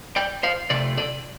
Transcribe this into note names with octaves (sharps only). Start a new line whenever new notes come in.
D5 G5
C5 F5
C3 A3 A4 D5
A4 D5